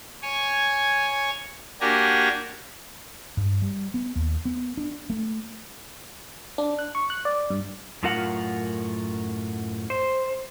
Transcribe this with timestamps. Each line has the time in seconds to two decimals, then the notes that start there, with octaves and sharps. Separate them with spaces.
0.22 C#5 G#5
1.81 A#3 D4 F#4 G4 G#5 A#5
3.37 G2
3.62 G3
3.94 B3
4.16 D#2
4.45 B3
4.77 D4
5.10 A3
6.58 D4
6.79 F#6
6.95 C#6
7.10 F#6
7.25 D5
7.50 G2
8.03 F#2 A2 F4 A#4 F#5
9.90 C5